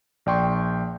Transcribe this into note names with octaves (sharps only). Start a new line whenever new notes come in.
A#1 D5 G5 C6 C#6